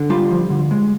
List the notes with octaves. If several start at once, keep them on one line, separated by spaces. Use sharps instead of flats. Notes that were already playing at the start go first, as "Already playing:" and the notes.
Already playing: D3
G3 F4
F3
D3
G#3